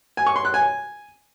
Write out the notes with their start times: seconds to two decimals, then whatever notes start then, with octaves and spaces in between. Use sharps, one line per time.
0.17 G#5
0.26 C#6
0.36 C6
0.45 F#6
0.54 G#5